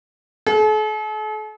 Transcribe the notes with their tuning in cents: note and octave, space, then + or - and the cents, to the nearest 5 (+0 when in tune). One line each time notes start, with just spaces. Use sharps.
A4 -45